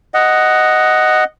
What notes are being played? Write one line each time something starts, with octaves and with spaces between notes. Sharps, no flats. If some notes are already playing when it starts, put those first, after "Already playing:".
D#5 F#5